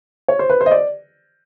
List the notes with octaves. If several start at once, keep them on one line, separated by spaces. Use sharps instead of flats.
C#5
C5
B4
C5
D#5
D5